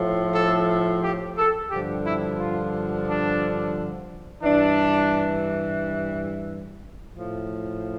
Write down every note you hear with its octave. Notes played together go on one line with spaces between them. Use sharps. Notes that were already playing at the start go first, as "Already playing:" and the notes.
Already playing: A2 F3
A4
G4
A4
G2 D3 F3 G4
E4
F4
D4
G2 E3 D4
A2 F3